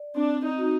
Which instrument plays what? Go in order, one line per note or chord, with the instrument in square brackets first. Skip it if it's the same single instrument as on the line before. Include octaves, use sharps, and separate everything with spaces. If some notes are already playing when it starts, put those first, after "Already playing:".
Already playing: [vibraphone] D5
[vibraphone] C4 [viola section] D4
[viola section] D#4
[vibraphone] F#4